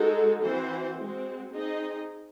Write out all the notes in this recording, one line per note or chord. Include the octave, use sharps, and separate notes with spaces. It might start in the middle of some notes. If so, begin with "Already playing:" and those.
Already playing: G#3 D#4 F#4 A4
E3 C4 F#4 C5
G#3 C4 F#4
C4 D#4 G#4 D#5